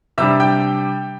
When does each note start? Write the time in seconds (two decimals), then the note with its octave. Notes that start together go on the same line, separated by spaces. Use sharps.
0.18 C3 G3 D4 E5 E6
0.40 G5 G6